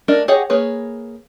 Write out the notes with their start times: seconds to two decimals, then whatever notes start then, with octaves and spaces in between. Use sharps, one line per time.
0.08 A3 D4 A#4 D#5
0.28 G4 G#4 C#5 D#5 F#5
0.50 A#3 G#4 B4 C#5